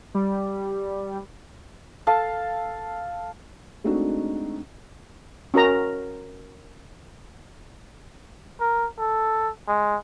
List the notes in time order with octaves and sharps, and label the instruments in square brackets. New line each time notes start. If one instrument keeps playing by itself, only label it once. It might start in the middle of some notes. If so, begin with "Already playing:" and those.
[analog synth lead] G3
[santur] A4 F5 A5
[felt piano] G#3 A3 C4 D4 D#4 F#4
[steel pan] C#4 F#4 A#4 A#5
[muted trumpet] A#4
A4
G#3